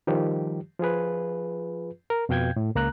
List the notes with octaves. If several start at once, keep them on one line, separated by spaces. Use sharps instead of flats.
D#3 F3 G3 G4
F3 F4 G#4 B4
A#4
F2 B2 F5 G5 G6 G#6
A2
C#2 A#3 A#5 F#6